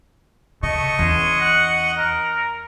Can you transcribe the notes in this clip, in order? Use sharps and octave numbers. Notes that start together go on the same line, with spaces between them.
C#3 A3 D#5 C#6
E2 G#3 C#4
F#5
A#4